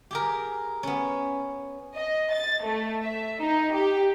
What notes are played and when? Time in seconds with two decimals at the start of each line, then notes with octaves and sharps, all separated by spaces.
0.11 G4 G#4 A#4
0.83 B3 C#4
1.96 D#5
2.34 A6
2.64 A3
3.03 E5
3.42 D#4
3.74 G4